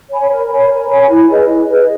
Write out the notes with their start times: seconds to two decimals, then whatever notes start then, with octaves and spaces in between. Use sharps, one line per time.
0.11 C#5 G#5 B5
0.30 A#4
0.50 C#5 G#5 B5
0.70 A#4
0.89 C#5 G#5 B5
1.09 E4
1.29 G#4 B4 D#5
1.48 E4
1.68 G#4 B4 D#5